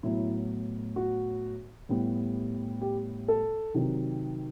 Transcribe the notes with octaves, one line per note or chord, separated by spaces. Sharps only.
A2 F#3 B3 E4
F#4
A2 G3 B3
G4
A4
C3 D#3 F#3 C4